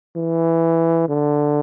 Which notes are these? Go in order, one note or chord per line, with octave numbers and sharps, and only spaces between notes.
E3
D3